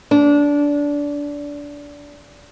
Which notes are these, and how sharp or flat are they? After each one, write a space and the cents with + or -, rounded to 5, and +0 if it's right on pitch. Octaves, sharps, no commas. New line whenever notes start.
D4 -20